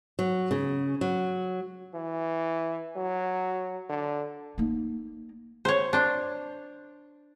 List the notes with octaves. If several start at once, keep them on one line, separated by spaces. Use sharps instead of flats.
F#3
C#3
F#3
E3
F#3
D3
A#3 D#4
C5 C#5
D4 C5